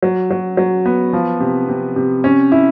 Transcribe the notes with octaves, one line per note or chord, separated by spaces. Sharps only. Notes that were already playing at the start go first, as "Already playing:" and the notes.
F#3
F#3
F#3
B3
F3
C3
C3
C3
C#4
E4